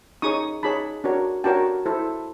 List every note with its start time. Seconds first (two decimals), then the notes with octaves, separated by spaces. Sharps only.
0.22 D#4 G#4 C#5 C#6 D#6
0.63 D#4 G#4 C#5 A5 B5
1.04 D4 F#4 A#4 C#5
1.44 D4 F#4 A#4 C#5 G5 A5
1.86 E4 A4 C5